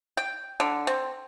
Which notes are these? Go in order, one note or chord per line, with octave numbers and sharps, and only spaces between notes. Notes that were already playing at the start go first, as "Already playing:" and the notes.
G5
D3
C4